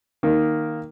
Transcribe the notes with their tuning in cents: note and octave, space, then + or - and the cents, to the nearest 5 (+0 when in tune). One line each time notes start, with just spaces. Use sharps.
D#3 +0 A#3 +0